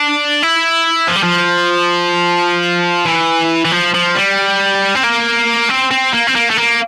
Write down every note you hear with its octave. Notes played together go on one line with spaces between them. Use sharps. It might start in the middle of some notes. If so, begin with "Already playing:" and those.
Already playing: D4
E4
F3
G3
F3
E3
E3
F3
F3
G3
C4
A#3
C4
C4
A#3
C4
A#3
A3
A#3